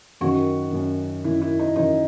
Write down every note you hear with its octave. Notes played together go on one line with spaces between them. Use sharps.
F#2 D#3 F#4
F#2 D#3
F#2 D#3 E4
E4
D#4
F#2 D#3 D#4